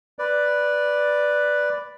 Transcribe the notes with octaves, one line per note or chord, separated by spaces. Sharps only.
B4 D5